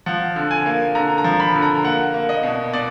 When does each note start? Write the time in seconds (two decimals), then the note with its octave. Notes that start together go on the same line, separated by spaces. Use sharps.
0.06 F3 F#5
0.36 D3
0.51 G#5
0.66 A#3
0.95 D3 A#5
1.18 A#5
1.24 F3
1.40 B5
1.55 D3
1.62 A#5
1.84 A#3 F#5
2.14 A#3
2.29 D#5
2.43 B2
2.73 B2 D5